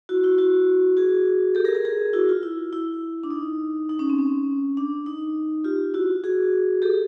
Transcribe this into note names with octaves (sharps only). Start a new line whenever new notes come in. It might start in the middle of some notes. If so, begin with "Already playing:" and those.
E4 F#4
E4 F#4
E4 F#4
F#4 G#4
G4 A4
G#4 A#4
G#4 A#4
G#4 A#4
E4 F#4
F4
E4
E4
D4
D#4
D#4
C#4
C4
C#4
D4
D#4
F4 G4
E4 F#4
F#4 G#4
G4 A4